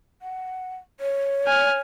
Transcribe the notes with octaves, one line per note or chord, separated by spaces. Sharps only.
F#5
C#5
G#5 F6